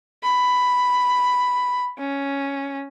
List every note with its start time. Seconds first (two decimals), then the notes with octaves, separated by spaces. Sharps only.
0.23 B5
1.98 C#4